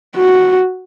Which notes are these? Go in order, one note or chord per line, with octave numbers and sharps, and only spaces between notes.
F#4